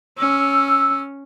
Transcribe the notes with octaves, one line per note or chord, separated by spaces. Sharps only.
C#4 E6